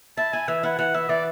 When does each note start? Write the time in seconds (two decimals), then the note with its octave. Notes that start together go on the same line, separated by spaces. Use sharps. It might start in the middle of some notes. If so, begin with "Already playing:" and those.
0.17 E4 A5
0.33 E4 G#5
0.48 E3 E5
0.63 E4 F#5
0.79 E3 F#5
0.94 E4 E5
1.09 E3 D5